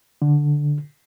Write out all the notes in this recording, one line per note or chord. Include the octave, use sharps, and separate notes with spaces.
D3